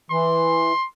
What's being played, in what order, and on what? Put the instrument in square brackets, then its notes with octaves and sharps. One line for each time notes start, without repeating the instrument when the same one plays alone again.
[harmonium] E3 [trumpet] C6